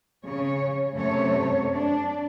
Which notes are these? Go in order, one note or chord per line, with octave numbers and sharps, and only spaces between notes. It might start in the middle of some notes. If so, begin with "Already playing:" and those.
C#3 C#5
F#2 C3 A3 C#5
D4